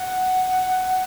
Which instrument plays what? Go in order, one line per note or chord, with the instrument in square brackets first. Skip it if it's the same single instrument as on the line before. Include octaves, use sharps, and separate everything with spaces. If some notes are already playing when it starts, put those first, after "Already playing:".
Already playing: [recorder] F#5